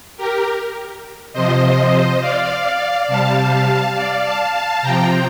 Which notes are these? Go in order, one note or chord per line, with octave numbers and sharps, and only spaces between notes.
G4 A#4
C3 F3 C5 D#5
D5 F5
C3 G3 F5 A5
D5 F5
F5 A5
F5 A5
C3 F3 G5 A#5